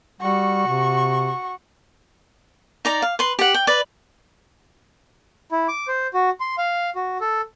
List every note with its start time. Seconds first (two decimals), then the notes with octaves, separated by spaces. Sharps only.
0.21 G3 F#4 C#6
0.67 C3
2.85 D#4 D5 A#5
3.02 F5
3.19 B4 C6
3.39 G4 F#5
3.54 G5
3.67 B4 D5
5.52 E4
5.68 D6
5.88 C5
6.14 F#4
6.40 C6
6.58 F5
6.95 F#4
7.21 A4